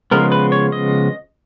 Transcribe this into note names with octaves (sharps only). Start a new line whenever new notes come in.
C#3 F3 G#3 B3 A#4
B4
C#5
D#5